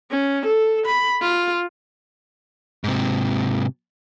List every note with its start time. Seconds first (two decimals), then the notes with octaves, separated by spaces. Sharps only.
0.11 C#4
0.46 A4
0.86 B5
1.21 F4
2.84 G#2 C3